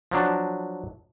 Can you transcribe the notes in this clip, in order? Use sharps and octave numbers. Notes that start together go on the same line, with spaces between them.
F3 F#3 D4